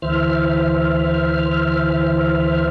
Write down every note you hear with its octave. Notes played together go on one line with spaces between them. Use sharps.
D2 E3 C5 E5 F6